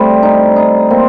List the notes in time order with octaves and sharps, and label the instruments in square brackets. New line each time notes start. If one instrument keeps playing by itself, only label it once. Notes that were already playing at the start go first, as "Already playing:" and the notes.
Already playing: [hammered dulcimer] G3 C4 [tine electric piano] A3
[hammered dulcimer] D#4
D#4
[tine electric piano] A#3 [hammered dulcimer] C4